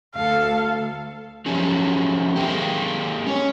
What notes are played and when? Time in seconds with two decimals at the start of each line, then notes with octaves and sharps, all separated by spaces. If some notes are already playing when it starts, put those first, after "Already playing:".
0.16 D2 A4 F5
1.46 F3 F#3 G#3 A3 C#4 G4
2.36 G#3 A#3 B3 C#4 G4
3.27 C#4 C#5